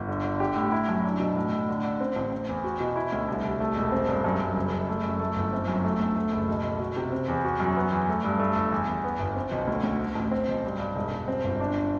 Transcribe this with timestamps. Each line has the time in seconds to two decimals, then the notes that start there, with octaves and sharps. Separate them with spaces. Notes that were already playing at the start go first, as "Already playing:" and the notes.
Already playing: G1
0.08 D3
0.24 D3
0.40 G4
0.56 A2
0.72 E4
0.89 F#2
1.04 D4
1.20 B2
1.36 A2
1.53 A2
1.69 D3
1.84 D3
2.00 C4
2.16 A1
2.32 C4
2.49 E2
2.64 F#4
2.80 B2
2.96 E4
3.12 D2
3.28 C2
3.45 C2
3.60 A3
3.76 E1
3.92 C4
4.08 G2
4.24 F#2
4.40 F#2
4.56 F#1
4.72 F#1
4.89 A3
5.04 F#2
5.19 A3
5.36 G1
5.53 C4
5.68 F#2
5.85 A3
6.00 D2
6.16 A3
6.32 F#1
6.48 B1
6.64 B1
6.80 F#4
6.97 C3
7.12 C4
7.28 E2
7.44 F#4
7.60 F#2
7.76 B3
7.92 E2
8.09 A3
8.24 G2
8.39 A3
8.56 G1
8.72 E2
8.88 E2
9.04 B3
9.20 G1
9.36 C4
9.51 B1
9.67 D2
9.83 D2
10.00 A3
10.15 A1
10.31 C4
10.48 B1
10.64 G2
10.80 G2
10.96 E1
11.12 E1
11.28 C4
11.44 G1
11.60 D4